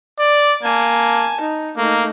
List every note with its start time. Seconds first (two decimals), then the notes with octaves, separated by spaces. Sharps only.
0.19 D5
0.63 A#3 G#5 A5
1.41 D#4
1.78 A3 A#3 D#4